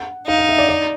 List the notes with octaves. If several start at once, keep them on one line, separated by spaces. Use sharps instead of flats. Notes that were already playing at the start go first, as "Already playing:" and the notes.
Already playing: F#5
D#4 F5
F5
E5
D5
D5